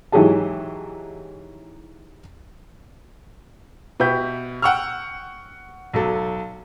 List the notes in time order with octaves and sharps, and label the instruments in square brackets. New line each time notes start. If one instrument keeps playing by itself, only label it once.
[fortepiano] G#2 E3 F#3 G4 G#4 A5
[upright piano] B2 G4 B4 E5 G6
F#5 G5 C#6 E6 F6
B1 F#3 A4